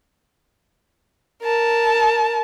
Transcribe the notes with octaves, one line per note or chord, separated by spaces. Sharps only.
A#4 A5